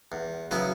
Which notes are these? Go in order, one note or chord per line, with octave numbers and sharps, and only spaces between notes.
E2
C#3 F#3 B3 E4